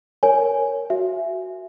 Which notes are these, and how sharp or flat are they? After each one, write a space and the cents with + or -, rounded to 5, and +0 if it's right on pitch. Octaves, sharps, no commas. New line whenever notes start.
A#4 +0 C#5 +0 G#5 +0
F#4 +5 E5 +20